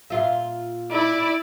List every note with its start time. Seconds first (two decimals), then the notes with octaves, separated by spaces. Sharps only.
0.10 A#2 F4 E5
0.91 E4 D5 D6